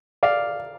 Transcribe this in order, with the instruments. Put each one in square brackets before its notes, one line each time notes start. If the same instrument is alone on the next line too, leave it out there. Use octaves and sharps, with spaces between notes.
[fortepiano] D5 F5